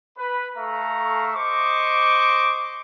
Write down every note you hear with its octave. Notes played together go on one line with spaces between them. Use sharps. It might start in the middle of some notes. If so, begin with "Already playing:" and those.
B4
A3 A4 E5 F5 A#5 C#6
C5 D#5 C#6 D6